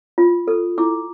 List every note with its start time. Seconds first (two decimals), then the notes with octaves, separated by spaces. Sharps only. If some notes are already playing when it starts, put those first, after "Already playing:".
0.18 F4
0.48 A4
0.78 E4 D6